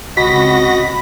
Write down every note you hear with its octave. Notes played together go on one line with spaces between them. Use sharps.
C#2 C3 F#4 D#5 B5 A#6 B6